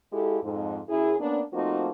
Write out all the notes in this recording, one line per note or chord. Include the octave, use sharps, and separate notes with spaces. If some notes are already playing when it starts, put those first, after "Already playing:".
G#3 E4 F4 G4 A4
F2 G#2
F#2 E4 G#4
A#3 B3 C#4 D4
F3 A3 A#3 C4 D#4 F#4